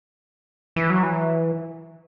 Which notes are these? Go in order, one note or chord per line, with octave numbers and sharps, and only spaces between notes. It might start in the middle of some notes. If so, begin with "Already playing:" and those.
E3
F#3
E3